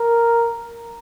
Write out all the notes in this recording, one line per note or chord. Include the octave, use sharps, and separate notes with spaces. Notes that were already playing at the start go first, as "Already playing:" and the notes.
Already playing: A#4